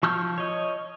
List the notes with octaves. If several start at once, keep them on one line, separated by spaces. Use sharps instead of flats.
F3 C#6 E6 F6 G6
C#5 D#5